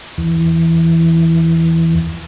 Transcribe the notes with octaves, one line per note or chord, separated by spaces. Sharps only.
E2 E3